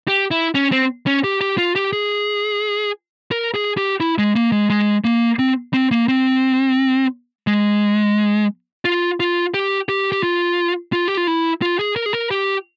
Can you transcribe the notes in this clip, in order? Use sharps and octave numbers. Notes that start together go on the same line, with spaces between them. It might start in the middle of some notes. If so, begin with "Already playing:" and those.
G4
E4
C#4
C4
C#4
G4
G4
F4
G4
G#4
A#4
G#4
G4
E4
G#3
A#3
G#3
G#3
A#3
C4
C4
A#3
C4
G#3
F4
F4
G4
G4
G4
F4
F4
G4
F4
E4
F4
G#4
A#4
G#4
A#4
G4